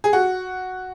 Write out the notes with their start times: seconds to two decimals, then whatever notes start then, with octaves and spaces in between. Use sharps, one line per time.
0.04 G#4
0.13 F#4